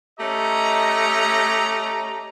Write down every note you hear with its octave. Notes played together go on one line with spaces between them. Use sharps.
A3 C#4 G4 D#5 A#5